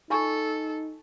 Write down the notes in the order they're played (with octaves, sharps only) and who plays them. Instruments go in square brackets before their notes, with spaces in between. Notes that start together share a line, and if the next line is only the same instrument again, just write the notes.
[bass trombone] D#4 [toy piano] F4 G#5 C#6 [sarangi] A4